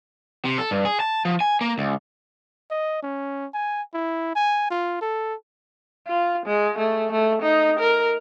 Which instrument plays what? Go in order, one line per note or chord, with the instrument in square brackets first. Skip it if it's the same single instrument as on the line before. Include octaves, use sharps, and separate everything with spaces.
[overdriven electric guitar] C3
A4
G2
G#4
A5
F3
G#5
A#3
C#2
[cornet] D#5
C#4
G#5
E4
G#5
F4
A4
[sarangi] F4
G#3
A3
A3
D#4
A#4